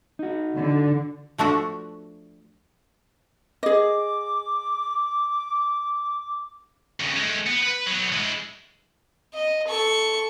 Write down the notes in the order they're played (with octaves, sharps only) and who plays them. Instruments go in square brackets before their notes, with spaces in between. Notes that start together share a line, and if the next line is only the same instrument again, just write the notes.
[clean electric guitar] D#4 F#4
[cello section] D3
[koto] F3 A3 D4 F#4
[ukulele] G#4 D#5 [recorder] D6
[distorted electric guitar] F2 C#3
G#3 A3
B3
B4
F#3 B3
G#3 E4
[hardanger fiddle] D#5
A4 C#6